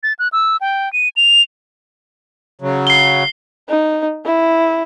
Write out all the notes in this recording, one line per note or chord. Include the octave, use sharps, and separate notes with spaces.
A6
F#6
E6
G5
D#7
F7
C#3 F#3
C7 G7
D#4
E4